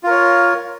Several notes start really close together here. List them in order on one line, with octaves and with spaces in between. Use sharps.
F4 A#4 C#5